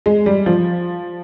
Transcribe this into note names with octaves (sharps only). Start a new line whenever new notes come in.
G#3
G3
F3